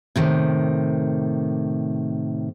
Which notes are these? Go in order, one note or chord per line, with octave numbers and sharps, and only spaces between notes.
A2 C3 D#3